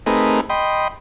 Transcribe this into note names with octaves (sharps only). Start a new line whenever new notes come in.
A3 C4 D#4 G#4 A#4 B4
D#5 G5 B5 C6